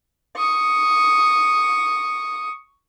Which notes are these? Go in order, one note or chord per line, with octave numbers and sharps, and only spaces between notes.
C#6 D#6